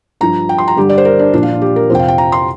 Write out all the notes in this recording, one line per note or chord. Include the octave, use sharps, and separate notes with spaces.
G2 F3 A#5
G5
C6
A#5
G2 D3 G3 G4
D5
C5
A#4
D4
A#2 F3 D4
F4
D4
G4
A#4
F2 C3 F3 C5 G5
F5
G5
A#5
C6